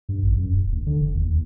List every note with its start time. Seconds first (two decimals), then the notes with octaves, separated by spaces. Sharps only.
0.09 G2
0.23 A1
0.36 F#2
0.52 D#1
0.72 D2
0.86 D3
1.00 F1
1.14 D#2
1.32 D#2